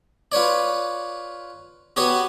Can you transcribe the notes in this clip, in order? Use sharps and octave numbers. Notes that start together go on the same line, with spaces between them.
F4 B4 C#5 D5
B3 F#4 G4 B4 C#5